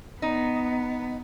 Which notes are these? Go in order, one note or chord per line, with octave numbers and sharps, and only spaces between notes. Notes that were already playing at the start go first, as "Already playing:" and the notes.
B3 D#4